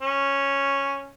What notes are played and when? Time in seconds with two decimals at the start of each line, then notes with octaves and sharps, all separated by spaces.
0.02 C#4